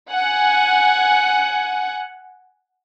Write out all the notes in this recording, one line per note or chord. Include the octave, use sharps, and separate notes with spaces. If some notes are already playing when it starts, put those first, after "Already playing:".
F#5 G#5